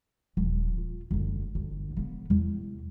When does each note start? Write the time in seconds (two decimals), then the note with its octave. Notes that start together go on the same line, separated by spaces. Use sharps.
0.37 D#1 F3
0.77 F4
1.11 F#1 D2
1.55 G1 D2
1.97 C#3 B3
2.30 E2 C3